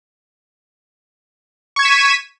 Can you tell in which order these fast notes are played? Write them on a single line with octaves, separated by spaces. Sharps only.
C#6 G#6 E7 B6 D#7